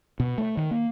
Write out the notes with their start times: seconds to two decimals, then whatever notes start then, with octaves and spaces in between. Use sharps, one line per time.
0.20 B2
0.38 A3
0.57 D#3
0.71 A#3